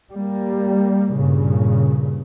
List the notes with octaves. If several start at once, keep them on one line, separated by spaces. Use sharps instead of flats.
G3 A#3
G2 A#2 C#3